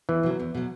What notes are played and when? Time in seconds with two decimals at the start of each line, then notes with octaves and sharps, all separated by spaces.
0.09 E2 E3
0.23 B2 F#3
0.40 E2
0.55 B2 F#3